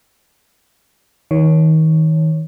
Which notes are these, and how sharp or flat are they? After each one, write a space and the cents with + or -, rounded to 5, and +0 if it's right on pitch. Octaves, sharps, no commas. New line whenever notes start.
D#3 +30 C#5 +0